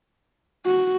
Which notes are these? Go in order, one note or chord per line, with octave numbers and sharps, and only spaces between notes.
F#4